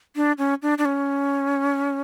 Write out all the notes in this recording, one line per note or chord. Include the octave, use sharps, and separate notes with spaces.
D4
C#4
D4
D4
C#4